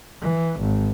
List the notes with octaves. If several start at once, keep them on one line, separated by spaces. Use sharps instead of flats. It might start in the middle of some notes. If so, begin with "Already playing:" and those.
E3
G#1